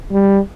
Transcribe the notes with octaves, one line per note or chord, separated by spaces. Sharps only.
G3